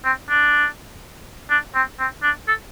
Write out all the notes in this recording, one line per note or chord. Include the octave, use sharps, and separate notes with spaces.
C4
D4
D4
C4
C4
D4
A4